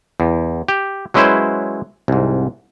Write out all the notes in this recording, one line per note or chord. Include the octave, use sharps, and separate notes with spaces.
E2
G4
F#3 G#3 C#4 E4 B4 C5
C2 G#2